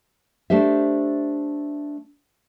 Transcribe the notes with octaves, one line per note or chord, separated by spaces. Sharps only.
A3 D4 G4 C5 E5